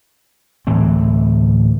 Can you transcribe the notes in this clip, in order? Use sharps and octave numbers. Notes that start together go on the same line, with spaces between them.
D1 A2 E3 C4